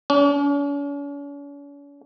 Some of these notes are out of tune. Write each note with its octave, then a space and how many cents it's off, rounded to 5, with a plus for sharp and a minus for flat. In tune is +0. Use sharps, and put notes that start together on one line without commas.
C#4 +45